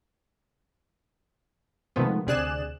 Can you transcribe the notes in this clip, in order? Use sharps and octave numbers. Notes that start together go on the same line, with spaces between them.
C3 D#3 F3 G#3 A3 B3
D2 C3 G#4 D5 F#6 E7